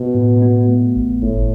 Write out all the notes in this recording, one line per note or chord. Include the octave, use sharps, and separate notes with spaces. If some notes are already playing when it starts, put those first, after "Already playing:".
Already playing: B2
A2
B3
A3
A1
G1 A2